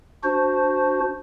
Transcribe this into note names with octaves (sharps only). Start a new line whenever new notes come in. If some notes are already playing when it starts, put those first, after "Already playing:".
D4 F#4 C5